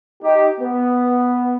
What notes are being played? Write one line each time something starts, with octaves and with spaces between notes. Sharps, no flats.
D#4 G4
B3